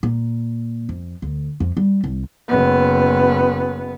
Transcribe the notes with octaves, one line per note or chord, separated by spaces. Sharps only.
A#2
F2
D2
F2
G3
C2
F#1 B3